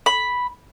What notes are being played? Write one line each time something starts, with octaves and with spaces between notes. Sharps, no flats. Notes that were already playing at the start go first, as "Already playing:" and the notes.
B5